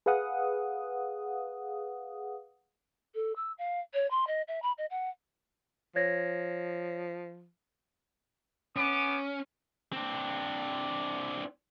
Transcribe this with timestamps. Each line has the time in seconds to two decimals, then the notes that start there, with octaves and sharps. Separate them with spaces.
0.06 G#4 B4 F5 F#5 D#6
3.14 A4
3.36 E6
3.58 F5
3.93 C#5
4.10 C6
4.27 D#5
4.47 E5
4.62 B5
4.78 D#5
4.90 F#5
5.96 F3 C#5 G#6 A#6
8.76 B3 C#4 D6
9.93 C4 D4